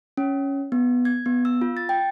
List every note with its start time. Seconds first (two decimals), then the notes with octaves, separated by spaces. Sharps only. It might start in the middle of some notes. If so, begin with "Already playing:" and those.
0.17 C#4
0.72 B3
1.05 G#6
1.26 B3
1.45 E6
1.62 F4
1.77 A6
1.89 G5